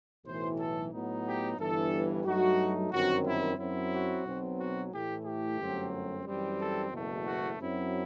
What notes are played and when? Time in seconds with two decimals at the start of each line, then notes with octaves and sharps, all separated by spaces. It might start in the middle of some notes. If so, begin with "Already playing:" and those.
0.24 B1 A2 E3 C5
0.59 A4
0.91 A2 F#3 B3 D#4
1.25 G4
1.59 G1 G2 E3 A4
2.25 G2 F#3 A3 D#4 F#4
2.91 G1 F#2 D#3 F#3 C4 F#4
3.25 E4
3.58 F#2 F#3 C4 E4
3.92 F#4
4.25 B1 B2 F#3 C4
4.59 F#4
4.91 A2 E3 A3 E4 G4
5.25 G4
5.57 G1 F#2 F#3 A3 C4
6.24 F#2 E3 G3 C4
6.58 A4
6.92 F#1 E2 B2 A3
7.25 F#4
7.58 F#2 F#3 C4 E4